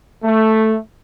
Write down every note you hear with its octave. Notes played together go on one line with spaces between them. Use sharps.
A3